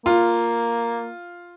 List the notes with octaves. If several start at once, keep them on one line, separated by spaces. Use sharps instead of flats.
A#3 F4